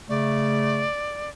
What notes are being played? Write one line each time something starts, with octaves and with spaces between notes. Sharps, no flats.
C#3 A3 D5